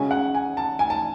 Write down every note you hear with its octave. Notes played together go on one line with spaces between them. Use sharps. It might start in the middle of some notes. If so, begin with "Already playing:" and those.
Already playing: C#3 G#3 C#4 F#4 C#5 G#5
F#5
G#5
A5
G#5
A5